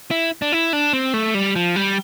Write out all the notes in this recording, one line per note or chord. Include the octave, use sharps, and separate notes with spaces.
E4
D4
E4
D4
C4
A3
G3
F3
G3